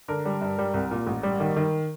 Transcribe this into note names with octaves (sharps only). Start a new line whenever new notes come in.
D3 A#4
G3
G2
G3
C2
A#2
A1
G3
D#3
D#3